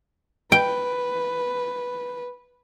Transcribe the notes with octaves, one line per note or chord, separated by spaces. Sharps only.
B4 G5